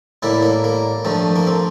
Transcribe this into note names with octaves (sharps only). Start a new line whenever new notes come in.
A2 G3 A#3 E4
A#3
A#3
G2 F3 A3
A#3
C4